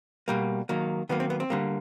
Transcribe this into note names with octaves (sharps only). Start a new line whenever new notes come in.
B2 G3 A#3
D#3 F#3 A#3
D#3 F#3 A#3 B3
C4
B3
C4
D3 G3 A#3